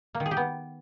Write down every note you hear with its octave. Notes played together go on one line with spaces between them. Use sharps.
A#3
D#3
G#4
G4
B3